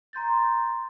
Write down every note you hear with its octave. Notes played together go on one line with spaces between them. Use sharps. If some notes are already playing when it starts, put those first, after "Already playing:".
A#5 C6 G6 A6